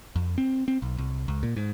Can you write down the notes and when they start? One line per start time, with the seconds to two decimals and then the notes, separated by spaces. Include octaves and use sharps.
0.16 F2
0.38 C4
0.68 C4
0.82 B1
0.98 C2
1.28 C#2
1.43 A#2
1.57 G#2